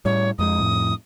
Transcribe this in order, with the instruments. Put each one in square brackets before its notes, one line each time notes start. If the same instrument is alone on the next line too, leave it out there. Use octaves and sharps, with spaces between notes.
[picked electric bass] A2 G3 [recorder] C#5
[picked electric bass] F2 G#3 [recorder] D#6
[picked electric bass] F2 A2